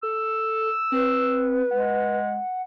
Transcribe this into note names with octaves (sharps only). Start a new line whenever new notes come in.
A4 E6
C4 B4
G#3 F#5